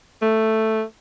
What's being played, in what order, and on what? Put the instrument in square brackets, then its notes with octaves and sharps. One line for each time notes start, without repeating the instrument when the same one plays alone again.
[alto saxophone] A3